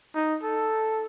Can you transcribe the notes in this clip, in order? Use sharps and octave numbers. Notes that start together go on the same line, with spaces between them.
D#4
A4